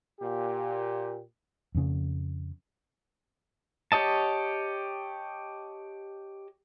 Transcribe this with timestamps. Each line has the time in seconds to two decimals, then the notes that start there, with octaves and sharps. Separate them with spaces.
0.20 A#2 G4
1.75 F2 C#3
3.92 G4 C#5 D#5 A5